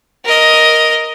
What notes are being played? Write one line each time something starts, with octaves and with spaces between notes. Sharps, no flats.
A#4 D#5